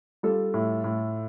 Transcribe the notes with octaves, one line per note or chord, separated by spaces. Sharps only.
G3 F4 A4
A2
A2